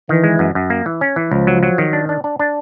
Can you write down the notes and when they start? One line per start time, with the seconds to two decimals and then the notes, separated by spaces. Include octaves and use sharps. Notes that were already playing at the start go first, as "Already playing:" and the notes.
0.09 D#3 E3
0.24 G#3
0.39 F#2
0.55 F#2
0.70 A#3
0.86 E3
1.01 C#4
1.16 E3
1.31 C#2 F3
1.47 F#3
1.63 F#3
1.78 D#3
1.93 D4
2.09 D4
2.24 D4
2.39 D4